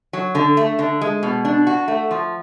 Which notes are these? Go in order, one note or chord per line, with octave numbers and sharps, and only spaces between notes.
F#3
D3
A3
D3
G#3
B2
D4
F#4
A3
F3